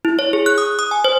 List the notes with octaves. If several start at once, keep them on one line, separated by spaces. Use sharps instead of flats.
E4
C#5
G#4
F#6
D#6
D#6
G#5
C5